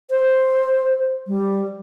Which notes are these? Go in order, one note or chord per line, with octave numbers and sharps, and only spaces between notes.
C5
G3